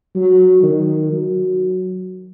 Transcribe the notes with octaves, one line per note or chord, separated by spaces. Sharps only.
F#3
D#3
F#3